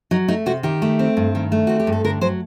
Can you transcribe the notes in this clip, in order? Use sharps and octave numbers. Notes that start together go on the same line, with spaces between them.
F#3 D#4
A3 D#4
C3 F#4
D#3 G4
A3
C4
G2
D#3
A3
C4 F#4
G4
G2
A4
D3 A#4
F#3 C5